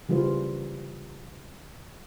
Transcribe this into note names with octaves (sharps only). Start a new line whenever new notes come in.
C#3 E3 G3 F4 B4 C5